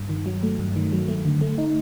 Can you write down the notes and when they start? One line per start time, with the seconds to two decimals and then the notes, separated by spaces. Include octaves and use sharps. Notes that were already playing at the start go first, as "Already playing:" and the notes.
Already playing: G2
0.09 D#3
0.26 F#3
0.43 A3
0.59 G2
0.76 D#3
0.93 F#3
1.08 A3
1.25 D3
1.41 A3
1.58 D#4